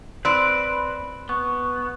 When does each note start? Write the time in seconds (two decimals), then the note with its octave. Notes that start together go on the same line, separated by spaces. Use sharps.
0.25 C4 B4 D5
1.29 B3 C#6